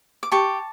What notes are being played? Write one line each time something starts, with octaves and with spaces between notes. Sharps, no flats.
D6
G4 A5 C#6